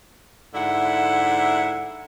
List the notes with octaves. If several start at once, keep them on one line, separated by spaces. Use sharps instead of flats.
G#2 D3 E4 E5 F#5